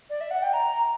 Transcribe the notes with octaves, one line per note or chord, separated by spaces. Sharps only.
D5
E5
F#5
G5
A#5